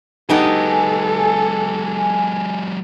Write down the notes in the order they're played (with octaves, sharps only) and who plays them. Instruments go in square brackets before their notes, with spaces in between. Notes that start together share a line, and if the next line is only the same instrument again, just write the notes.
[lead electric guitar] F#3 G#3 [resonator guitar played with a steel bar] B3 D#4 G4 [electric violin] A4 [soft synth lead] G#5